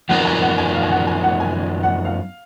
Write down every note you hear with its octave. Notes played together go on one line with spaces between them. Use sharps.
F#2 F3 B3 D#4 A#4 F#5
G#5
F#5
G#5
F5
G#5
F#5
G#5
F#5
G#5
F#5
F5